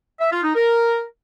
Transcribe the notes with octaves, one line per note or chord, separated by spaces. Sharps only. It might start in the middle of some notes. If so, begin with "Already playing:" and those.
E5
F4
D#4
A#4